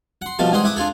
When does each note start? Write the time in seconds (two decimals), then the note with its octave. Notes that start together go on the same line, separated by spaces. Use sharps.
0.22 F#5 C6
0.39 B2 F3 G3 A3 A5
0.52 G#2 E3 G3 F#5 C6 D#6
0.64 E4 B4 D6 D#6
0.76 D4 F4 G#4 A4